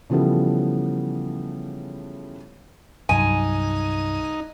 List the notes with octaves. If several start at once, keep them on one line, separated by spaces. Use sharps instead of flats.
C#3 E3 F3 G3 B3 A4
C2 G2 F#3 D#4 G#5